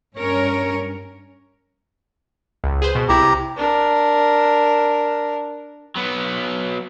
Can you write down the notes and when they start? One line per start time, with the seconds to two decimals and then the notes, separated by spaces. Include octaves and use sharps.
0.17 G2 C#4 A#4 C#5
2.64 C#2
2.82 G#4 B4 C5
2.95 B2
3.09 C2 E4 G4 A#5
3.22 C3
3.57 D4 A#4
5.95 F#3 B3